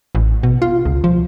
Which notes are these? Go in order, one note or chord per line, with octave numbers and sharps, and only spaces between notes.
A1
B2
F4
C#2
F3